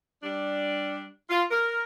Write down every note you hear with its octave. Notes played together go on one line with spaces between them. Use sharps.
G3 D4
F4
A#4